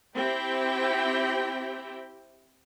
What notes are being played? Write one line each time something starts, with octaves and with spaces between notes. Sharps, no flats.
C4 E4 G4 G5